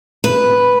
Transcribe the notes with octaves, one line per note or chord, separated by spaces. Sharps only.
B4